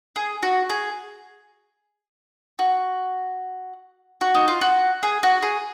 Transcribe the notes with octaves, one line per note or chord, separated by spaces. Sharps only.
G#4
F#4
G#4
F#4
F#4
D#4
F4
F#4
G#4
F#4
G#4